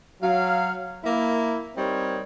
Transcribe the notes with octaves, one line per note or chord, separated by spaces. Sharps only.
F#3 F5
A#3 E4
G3 C4 D#4 A#4 C#5